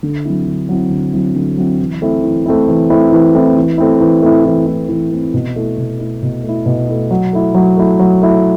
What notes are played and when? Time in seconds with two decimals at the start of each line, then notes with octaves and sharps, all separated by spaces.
0.03 D3
0.25 F#3 C4 E4
0.47 D3
0.69 F#3 C4 E4
0.90 D3
1.13 F#3 C4 E4
1.35 D3
1.57 F#3 C4 E4
1.79 E3
2.02 A3 C4 E4
2.24 E3
2.46 A3 C4 E4
2.68 E3
2.90 A3 C4 E4
3.12 E3
3.35 A3 C4 E4
3.56 E3
3.78 A3 C4 E4
4.00 E3
4.22 A3 C4 E4
4.45 E3
4.66 A3 C4 E4
4.89 E3
5.11 A3 C4 E4
5.34 B2
5.56 A3 E4
5.78 B2
5.99 A3 E4
6.23 B2
6.43 A3
6.49 E4
6.66 B2
6.88 A3 E4
7.11 F#3
7.33 A3 E4
7.54 F#3
7.77 A3 E4
7.99 F#3
8.22 A3 E4